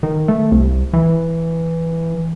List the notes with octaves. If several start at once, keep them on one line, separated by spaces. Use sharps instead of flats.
D#3
A3
C2
E3